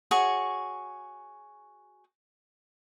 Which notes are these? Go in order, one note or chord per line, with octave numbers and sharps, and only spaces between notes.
F#4 G#4 C#5